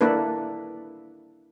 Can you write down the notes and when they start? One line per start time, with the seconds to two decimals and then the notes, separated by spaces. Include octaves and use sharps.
0.01 A#3 D4 E4 A4 B4